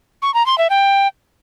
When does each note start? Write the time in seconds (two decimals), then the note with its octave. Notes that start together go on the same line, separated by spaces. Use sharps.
0.22 C#6
0.34 A#5
0.46 C6
0.58 E5
0.70 G5